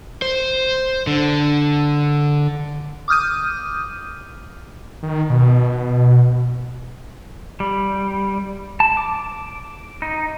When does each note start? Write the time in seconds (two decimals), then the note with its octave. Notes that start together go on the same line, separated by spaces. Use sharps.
0.22 C5
1.07 D3
3.08 D6 D#6 F6 G6 D#7
5.03 D#3
5.30 B2
7.60 G3
8.80 A5
8.97 D6
10.02 D#4